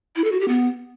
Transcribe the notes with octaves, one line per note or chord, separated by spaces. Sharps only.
E4
A4
F#4
G4
B3